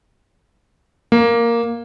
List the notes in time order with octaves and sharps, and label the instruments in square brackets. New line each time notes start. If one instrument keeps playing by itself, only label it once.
[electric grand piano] A#3